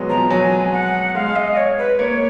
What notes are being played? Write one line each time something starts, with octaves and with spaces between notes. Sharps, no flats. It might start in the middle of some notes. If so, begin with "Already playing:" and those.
Already playing: F#3 G#3 B3
F3 A#5
F#3 G#5
F#5
G#3 F5
D#5
C#5
B4
A#3 C#5